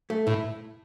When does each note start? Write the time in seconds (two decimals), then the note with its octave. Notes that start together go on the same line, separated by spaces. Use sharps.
0.10 A3
0.27 A2 E4